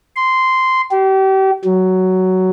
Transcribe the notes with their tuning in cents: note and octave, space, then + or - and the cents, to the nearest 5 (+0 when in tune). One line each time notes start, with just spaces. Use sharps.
C6 -10
G4 -35
F#3 +10